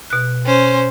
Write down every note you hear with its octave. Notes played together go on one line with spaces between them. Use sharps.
B2 F#6
C#4 C5